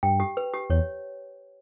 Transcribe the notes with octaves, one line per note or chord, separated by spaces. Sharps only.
G2 G5
G4
B4
G4
E2 C#5